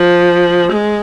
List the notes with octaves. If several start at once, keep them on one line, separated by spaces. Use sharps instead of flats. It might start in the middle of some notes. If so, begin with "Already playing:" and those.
Already playing: F3
G#3